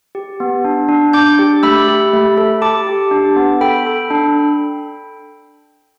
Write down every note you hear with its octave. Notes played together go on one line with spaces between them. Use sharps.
G4
B3
D4
D4
D4 D6 G6
G4
A3 B5 E6
G4
A3
A4
G4 A5 D6
G4
D4
B3
A4 G5 B5
A4
D4